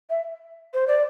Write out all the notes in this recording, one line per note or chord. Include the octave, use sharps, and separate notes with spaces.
E5
C5
D5